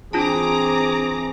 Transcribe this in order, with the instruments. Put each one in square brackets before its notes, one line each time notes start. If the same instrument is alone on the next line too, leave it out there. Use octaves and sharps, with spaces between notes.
[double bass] E3 C4 [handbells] D4 F4 A5 [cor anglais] G#4 [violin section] A#5 D6